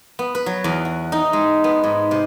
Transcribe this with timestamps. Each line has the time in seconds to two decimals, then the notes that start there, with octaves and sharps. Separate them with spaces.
0.19 B3
0.35 B4
0.46 F#3
0.64 E2
0.85 F#4
1.12 D#4
1.33 G#3
1.64 B3
1.83 G#2
2.11 C3